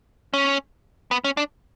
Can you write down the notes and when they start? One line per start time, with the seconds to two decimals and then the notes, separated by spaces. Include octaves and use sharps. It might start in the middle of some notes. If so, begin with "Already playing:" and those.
0.34 C#4
1.11 B3
1.24 C#4
1.37 D4